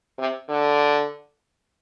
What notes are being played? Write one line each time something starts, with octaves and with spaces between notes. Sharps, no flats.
C3
D3